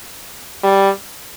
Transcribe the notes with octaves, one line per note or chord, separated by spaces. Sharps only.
G3